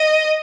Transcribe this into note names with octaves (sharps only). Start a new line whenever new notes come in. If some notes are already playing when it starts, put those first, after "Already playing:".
Already playing: D#5